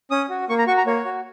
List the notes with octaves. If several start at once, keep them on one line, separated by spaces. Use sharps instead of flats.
C#4 D#6
F#4
A#3 C#6
A#5
F#4 C#6
A#5
A#3 C#5
F#4